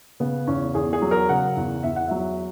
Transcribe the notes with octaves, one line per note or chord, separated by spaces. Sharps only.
C#3 B3
E2 C#4
E2 G#4
G#4
F#3
A#4
C#3 F#5
E2
E2 E5
F#5
F#3 E5